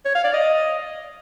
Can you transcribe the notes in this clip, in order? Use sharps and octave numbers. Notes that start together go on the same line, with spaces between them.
C#5
F5
D5
D#5